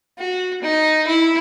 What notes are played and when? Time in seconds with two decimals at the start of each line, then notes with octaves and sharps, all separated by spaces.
0.18 F#4
0.63 D#4
1.07 E4